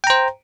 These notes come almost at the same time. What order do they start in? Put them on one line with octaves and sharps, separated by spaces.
G5 A#5 C5